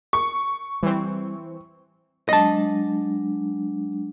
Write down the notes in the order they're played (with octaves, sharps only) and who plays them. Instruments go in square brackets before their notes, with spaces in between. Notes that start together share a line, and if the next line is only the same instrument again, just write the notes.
[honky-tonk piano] C#6
[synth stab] E3 C4 [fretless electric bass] G3
[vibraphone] F#3 G#3 D4 [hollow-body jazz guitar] D#5 A5